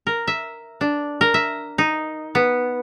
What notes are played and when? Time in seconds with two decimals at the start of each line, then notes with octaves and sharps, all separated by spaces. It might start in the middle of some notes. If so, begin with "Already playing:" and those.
0.07 A#4
0.27 E5
0.81 D4
1.21 A#4
1.34 E5
1.78 D#4
2.35 B3